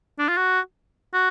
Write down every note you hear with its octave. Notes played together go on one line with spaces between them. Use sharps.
D4
F4
F#4
F#4